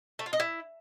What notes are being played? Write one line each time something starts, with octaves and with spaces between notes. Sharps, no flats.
A3
F4
D#5
E4